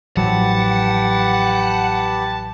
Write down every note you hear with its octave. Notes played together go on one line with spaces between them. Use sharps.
A1 F3 F#3 G4 B4 F#5 A5